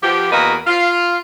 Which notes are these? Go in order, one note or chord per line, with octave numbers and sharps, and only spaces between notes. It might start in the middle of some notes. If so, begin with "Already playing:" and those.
F3 B3 G4
E2 A#3 F#4 A#4 B4 D#5
F4 F5